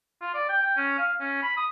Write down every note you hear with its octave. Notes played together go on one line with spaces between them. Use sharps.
F4
D5
G5
G5
C#4
F5
C#4
B5
D#6